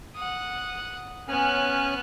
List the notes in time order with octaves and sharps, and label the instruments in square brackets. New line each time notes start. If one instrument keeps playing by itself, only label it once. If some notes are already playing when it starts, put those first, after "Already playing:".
[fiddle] F#5 D#6
[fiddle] B3 F#6 [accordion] C#4 G#5 F6